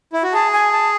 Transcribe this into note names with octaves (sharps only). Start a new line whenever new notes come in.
E4
F#4
G#4 A5
G#5
A5